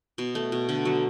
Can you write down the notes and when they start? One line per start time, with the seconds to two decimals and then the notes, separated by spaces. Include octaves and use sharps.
0.18 B2
0.35 A3
0.52 B2
0.69 D3
0.85 F#3